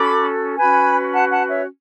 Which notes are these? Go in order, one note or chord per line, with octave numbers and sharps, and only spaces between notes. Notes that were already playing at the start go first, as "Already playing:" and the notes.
Already playing: C#4 F#4 A4 B5 D6
C#4 F#4 B4 G#5 B5
F#5 A5
F#5 A5
C#5 E5